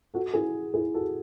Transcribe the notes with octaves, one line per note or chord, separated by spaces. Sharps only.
F#4 A4
E4 G#4
E4 G#4
F#4 A4